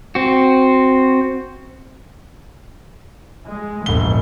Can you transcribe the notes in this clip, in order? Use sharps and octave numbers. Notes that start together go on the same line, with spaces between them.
C4 F#4
G#3
E1 A#1 G#2 G7